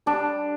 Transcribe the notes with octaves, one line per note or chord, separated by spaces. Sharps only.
G3 D4